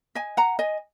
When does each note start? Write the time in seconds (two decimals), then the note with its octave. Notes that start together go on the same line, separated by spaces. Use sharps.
0.15 D#5 G#5
0.37 F#5 A#5
0.59 D#5 G#5